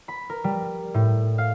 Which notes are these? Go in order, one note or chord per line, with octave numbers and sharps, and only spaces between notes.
B5
A#4
G3
A2
F5